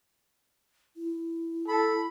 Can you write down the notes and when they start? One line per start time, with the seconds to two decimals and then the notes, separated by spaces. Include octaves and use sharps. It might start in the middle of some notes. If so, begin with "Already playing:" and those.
0.96 E4
1.68 A4 B5